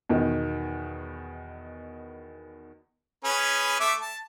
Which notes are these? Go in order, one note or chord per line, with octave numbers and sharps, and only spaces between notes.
E2 B2 D#3
C#4 G#4 B4
A3 E5 D6
A5